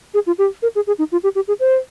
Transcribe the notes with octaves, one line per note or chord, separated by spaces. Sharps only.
G#4
F4
G4
A#4
G#4
G#4
D#4
F4
G4
G4
G#4
C5